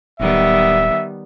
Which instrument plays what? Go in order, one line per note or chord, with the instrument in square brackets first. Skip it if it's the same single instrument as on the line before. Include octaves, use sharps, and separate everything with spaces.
[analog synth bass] D1 [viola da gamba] D#3 G3 B3 [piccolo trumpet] E5